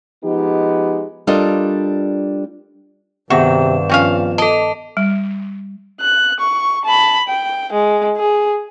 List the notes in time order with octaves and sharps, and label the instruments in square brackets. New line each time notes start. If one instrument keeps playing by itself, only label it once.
[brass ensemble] F3 G#3 B3 D#4 G4
[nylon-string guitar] G3 D4 F4 A4 A#4 D#5
[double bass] G2 [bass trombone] C3 [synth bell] D#3 B3 E7 [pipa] F#4
[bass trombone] F3 [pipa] C4 C#4 F5
[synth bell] A4 A5 [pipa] D#5
[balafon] G3
[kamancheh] F#6
C#6
A5 B5
G5
G#3
G#4